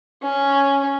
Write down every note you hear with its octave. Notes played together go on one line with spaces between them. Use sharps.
C#4